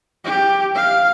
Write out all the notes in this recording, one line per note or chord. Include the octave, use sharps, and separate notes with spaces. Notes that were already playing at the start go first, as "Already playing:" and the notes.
G4
F5